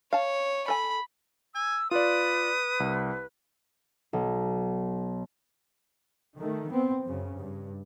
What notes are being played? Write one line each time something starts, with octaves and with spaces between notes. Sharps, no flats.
C#5 F5 A5
A4 G#5 B5
G#5 E6
F4 B4 D5 D#6
C2
B1
D#3 A3
B3 C4
F#2 C#3
G2